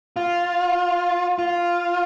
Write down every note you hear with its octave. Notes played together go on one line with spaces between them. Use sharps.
F4
F4